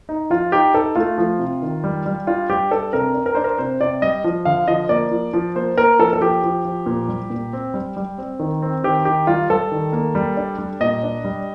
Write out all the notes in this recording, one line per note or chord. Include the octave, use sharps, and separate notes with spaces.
D#4
F3 F4
D#4 G4
D#4 A4
A3 F4
F3
C3
D#3
G3
G3
D4 F4
G3 G4
D4 A4
C3 A#4
D4
A#4
D4 C5
A#4
C3 C5
C3 D5
G3 D#5
F3
D3 F5
F3 D#5
A#3 D5
F3
F3
A#3 C5
A#3 A#4
F3 A4
A4
F3 G4
F3
F3
A#2
G3
A#2
C4
G3
G3
C4
D#3
C4
D#3 G4
D#3 G4
G3 F4
G3 A4
D#3
A#3
G3
D4
G3
A#2 D#5
D4
G3